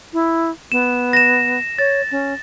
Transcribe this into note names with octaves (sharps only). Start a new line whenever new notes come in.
E4
B3 E7
A#6 E7
C#5 A6
C#4